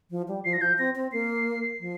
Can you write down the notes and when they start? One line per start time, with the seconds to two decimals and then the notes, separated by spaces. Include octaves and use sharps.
0.10 F3
0.28 G3
0.45 F3 C7
0.53 A#6
0.61 F3 G6
0.78 C4 A#6
0.96 C4
1.12 A#3 C7
1.80 F3